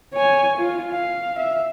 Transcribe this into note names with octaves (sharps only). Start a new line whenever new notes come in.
C#5 G#5
F4
F5
E5